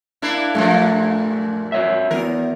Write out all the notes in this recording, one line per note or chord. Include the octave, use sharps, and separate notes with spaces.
A#3 D4 E4
F#2 A#2 F3 A3
F#4 C#5 E5
E3 B3 A#4